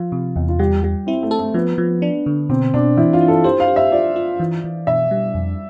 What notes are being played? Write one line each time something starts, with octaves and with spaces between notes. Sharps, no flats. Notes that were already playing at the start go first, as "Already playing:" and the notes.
Already playing: F3 F4
C3
E2
F4
G3 G4
G3 G4
C4 E4
A3
A4
A3
F3 B3
F3
D4
D3
B2 C4
B2 D4
E3 E4
F4
E4
A4
G4 C5
F5
G4
E5
F4 D5
F4
E3
E3
B2 E5
G3
F2